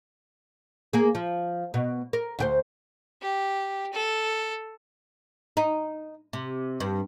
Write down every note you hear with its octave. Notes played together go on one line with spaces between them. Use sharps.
A#3 G#4
F3
B2
A#4
D2 G4 C5
G4
A4
D#4
C3
G2